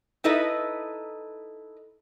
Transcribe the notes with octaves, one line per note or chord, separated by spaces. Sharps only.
D#4 E4 A4 B4 D#5